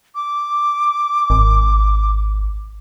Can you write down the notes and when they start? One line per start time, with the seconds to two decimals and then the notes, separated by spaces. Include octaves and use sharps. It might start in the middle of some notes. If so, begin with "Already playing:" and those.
0.15 D6
1.30 G#1